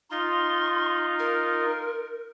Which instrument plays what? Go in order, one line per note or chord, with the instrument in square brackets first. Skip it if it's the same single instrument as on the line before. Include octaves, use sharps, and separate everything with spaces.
[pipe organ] D#4 F4 [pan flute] C6
[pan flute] A#4